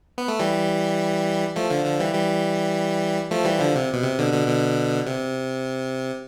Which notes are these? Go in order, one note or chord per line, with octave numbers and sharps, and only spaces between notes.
B3
A3
E3 G3
F3 A3
D3 F3
D3 F3
E3 G3
E3 G3
F3 A3
E3 G3
D3 F3
C3
B2
C3
B2 D3
B2 D3
B2 D3
C3